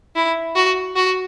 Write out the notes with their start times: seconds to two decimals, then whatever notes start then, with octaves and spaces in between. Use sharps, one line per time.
0.15 E4
0.56 F#4
0.96 F#4